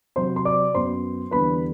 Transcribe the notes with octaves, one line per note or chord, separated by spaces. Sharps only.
C3 F#3 C4 C5 C6
C6
D5 D6
F#2 F#3 B3 C5 C6
E2 D3 G3 B3 D4 B4 B5